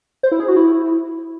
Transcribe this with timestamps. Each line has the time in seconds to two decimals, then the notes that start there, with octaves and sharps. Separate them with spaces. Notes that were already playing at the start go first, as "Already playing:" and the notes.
0.23 C5
0.32 E4
0.40 G#4
0.48 F#4
0.56 E4